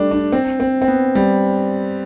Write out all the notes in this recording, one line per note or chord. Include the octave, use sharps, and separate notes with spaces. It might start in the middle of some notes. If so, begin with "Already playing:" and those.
Already playing: G3 A3 D4
D4
C4
C4
C4
B3
G3